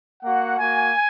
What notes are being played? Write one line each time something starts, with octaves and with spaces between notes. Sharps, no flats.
A#3 F#4 F#5
A#3 F#4 G#5